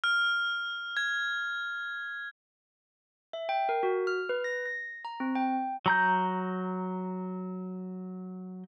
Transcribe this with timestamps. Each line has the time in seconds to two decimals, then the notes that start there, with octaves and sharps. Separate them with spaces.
0.04 F6
0.97 G#6
3.33 E5
3.49 G5
3.69 A#4
3.83 F#4
4.07 F6
4.29 B4
4.44 A#6
4.66 A#6
5.05 A#5
5.20 C4
5.35 G5
5.86 F#3 A#5 G6